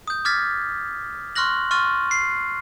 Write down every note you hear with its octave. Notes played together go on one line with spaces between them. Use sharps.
D#6 G6
D6 F6 G#6 A6 B6
C6 C#6 F6 F#6 A#6 F#7
C6 C#6 F6 A6 D#7
C7